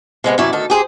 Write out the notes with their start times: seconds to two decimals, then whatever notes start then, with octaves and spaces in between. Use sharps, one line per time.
0.24 C3 G#3 B3 A4
0.38 F#2 C3 E4 C#5 D5
0.52 D2 D#3 A4
0.70 G4 G#4 A#4 C5